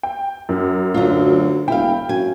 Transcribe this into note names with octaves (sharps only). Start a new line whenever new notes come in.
G5
F#2
D2 F#3 F4
E1 E4 F5 G5
F#2 G#5